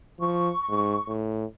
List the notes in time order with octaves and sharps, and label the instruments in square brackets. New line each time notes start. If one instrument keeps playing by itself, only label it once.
[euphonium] F3 [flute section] C#6
[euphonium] G#2
A2